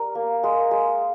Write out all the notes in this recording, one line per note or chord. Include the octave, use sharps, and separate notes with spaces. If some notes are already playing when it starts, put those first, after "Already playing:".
Already playing: G3 A#4
A#3
G#3
G#3